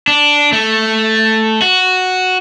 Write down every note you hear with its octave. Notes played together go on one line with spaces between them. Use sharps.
D4
A3
F#4